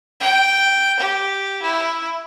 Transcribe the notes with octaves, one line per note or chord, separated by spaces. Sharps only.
G5
G4
E4